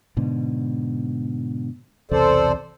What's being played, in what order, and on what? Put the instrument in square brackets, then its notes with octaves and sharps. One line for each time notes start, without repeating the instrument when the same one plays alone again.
[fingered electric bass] G#2 B2 D3
[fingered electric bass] B1 E2 C3 [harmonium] A4 C5 D5